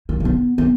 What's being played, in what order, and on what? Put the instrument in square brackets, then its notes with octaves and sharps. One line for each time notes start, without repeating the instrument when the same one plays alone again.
[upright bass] A#3
A#3
B3
B3